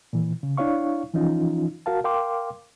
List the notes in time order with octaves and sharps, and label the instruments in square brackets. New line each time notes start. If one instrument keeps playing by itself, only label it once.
[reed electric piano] A#2 E3
C#3
D4 E4 C#5 F5 C#6
E3 F3 C#4 D#4 F4
F#4 A#4 F5 A5
A#4 F5 G5 C6 D6